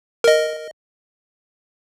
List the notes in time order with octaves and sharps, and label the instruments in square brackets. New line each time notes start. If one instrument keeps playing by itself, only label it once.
[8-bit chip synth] A#4 D#5